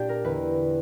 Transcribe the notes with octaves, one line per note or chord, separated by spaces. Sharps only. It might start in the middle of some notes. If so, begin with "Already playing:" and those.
Already playing: A#2 D4 G4
A#4
E2 D3 B4